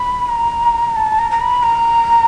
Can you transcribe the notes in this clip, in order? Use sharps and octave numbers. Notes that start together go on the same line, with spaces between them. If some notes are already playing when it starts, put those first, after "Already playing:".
Already playing: B5
A#5
A5
A#5
A#5
B5
A#5